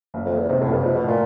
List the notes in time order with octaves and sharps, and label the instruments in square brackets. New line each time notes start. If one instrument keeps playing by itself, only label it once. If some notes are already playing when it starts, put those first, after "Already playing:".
[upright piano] F#1
[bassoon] F2
[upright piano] F#1
[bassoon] E2
[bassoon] G#2 [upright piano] C3
[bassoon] A2
[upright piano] F#1
[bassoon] G2
[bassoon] G#2 [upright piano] F3
[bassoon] B2
[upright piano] A2
[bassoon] A#2